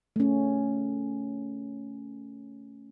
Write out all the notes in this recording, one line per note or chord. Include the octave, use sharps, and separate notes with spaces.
A3 C#4